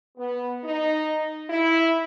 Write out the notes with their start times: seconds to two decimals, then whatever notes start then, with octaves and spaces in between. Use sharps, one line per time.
0.18 B3
0.64 D#4
1.50 E4